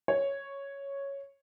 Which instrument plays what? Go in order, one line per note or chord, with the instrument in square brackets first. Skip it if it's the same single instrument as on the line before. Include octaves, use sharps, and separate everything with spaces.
[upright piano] C#5